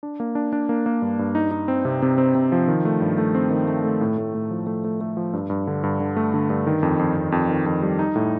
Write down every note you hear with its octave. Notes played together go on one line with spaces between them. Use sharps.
D4
A#3
D4
D4
A#3
A#3
G2
G2
D#4
D#4
C4
C3
C3
C4
C3
F3
D#3
A3
G2
A3
C4
D#3
A3
A3
A2
A2
A2
F3
A3
A3
A3
F3
G2
G2
D3
G2
D3
A3
D3
G2
D#3
F2
F2
F2
F2
D#3
F2
G3
D#4
A2